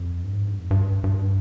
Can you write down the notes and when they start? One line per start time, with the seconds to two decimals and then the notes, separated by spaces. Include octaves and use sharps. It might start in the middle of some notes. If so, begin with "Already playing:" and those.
Already playing: F2
0.23 G2
0.35 G#2
0.48 G2
0.59 F2
0.71 G2
1.04 G2